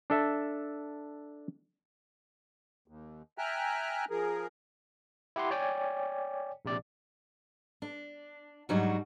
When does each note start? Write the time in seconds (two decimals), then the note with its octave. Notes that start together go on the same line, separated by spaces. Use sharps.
0.10 D4 A4 E5
2.88 D#2
3.38 E5 G5 G#5 A#5 F6 F#6
4.10 F3 G#4 A#4
5.36 E4 G4 F#5 C6
5.51 C#5 D5 G5 G#5
6.65 A#1 C3 D5
7.82 D4
8.69 G#2 F#3 G3 D4 D#4 F#4